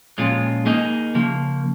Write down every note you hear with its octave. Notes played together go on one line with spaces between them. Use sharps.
A#2 F3 G#3 C#4 F4
A#3 D#4 G#4 D#5
C#3 F3 A#3